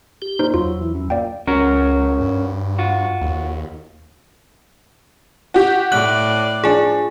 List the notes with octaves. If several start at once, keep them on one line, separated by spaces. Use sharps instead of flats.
G4
A#2 D#4 C5
E2 F#3 F4
E3
F#2
A#2 D5 F5 G5
C#2 C#4 F#4 A#4
G2
F4 F#4
D#2
F#4 G4
A2 D5 F#6 F#7
F3 D4 G#4 G#5